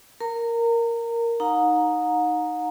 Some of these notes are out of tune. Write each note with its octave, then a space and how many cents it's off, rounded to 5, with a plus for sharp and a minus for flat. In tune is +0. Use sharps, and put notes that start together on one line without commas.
A#4 +0 A#5 -30
D#4 +0 F#5 -45 A#5 +0